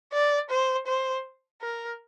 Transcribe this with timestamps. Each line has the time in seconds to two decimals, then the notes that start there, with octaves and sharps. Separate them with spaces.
0.13 D5
0.50 C5
0.87 C5
1.62 A#4